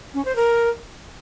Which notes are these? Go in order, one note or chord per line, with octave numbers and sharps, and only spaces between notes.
C#4
C5
A#4